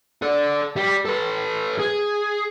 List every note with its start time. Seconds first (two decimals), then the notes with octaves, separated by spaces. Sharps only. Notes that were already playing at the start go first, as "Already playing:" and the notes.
0.22 A4 D5
0.76 G3
1.05 A4 B4
1.79 G#4